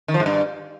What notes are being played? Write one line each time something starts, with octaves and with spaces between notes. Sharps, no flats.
D#3
F3
G#2
G2